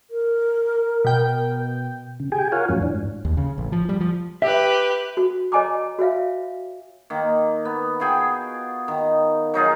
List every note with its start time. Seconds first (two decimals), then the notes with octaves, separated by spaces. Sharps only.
0.10 A#4
1.05 B2 G5
2.20 C#3
2.32 G4 G#4 G5 G#5
2.52 F4 A#4 C#5 F5 F#5 G#5
2.69 F2 A2 F#3 C#4
2.83 E3 D4
2.95 G#2
3.25 D#2
3.37 C#3
3.58 A1
3.72 F3
3.89 G3
4.01 F3
4.42 G4 B4 E5
5.17 F#4
5.52 C#5 D#5 G#5 A#5 D6
5.99 F#4 C#5 E5 F5
7.10 D#3 A#3
7.65 B3
8.00 F4 F#4 G#4 G5
8.88 D#3
9.54 F#3 D#4 F4 G#4